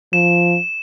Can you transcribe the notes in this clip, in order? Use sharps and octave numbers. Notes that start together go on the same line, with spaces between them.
F3 E7